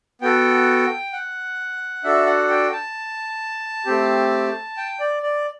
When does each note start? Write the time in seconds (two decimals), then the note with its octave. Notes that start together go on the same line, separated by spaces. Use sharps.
0.22 B3 F#4 A4 G5
1.13 F#5
2.04 D4 F#4 A4 E5
2.26 F#5
2.49 G5
2.73 A5
3.86 A3 C4 G4
4.77 G5
5.00 D5
5.23 D5